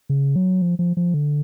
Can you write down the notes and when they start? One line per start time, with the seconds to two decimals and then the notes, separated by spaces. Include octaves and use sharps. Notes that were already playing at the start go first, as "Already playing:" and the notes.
0.09 C#3
0.36 F#3
0.62 F3
0.79 F3
0.97 F3
1.14 D3